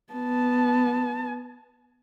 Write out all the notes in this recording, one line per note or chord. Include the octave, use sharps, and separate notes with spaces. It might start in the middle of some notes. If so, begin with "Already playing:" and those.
B3 A5